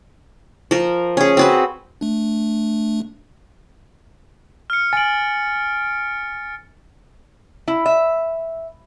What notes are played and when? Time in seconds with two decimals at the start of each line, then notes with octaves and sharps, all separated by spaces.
0.71 F3 A#4
1.17 C#4 G#4
1.37 C4 F#4 B4
2.01 A3 D4
4.70 F6 C#7
4.93 G#5 A6 D7 F#7
7.68 E4
7.86 E5